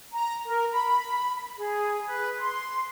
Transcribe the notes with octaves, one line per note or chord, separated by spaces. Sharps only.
A#5
A#4
B5
G#4
B4
C6